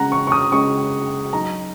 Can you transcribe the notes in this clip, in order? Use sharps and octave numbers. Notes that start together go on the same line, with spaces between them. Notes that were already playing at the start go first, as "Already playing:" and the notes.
Already playing: C#3 G#3 C#4 F#5 A#5
C#6
C#6
D#6
C#3 G#3 C#4 C#6
F#3 D#4 A#5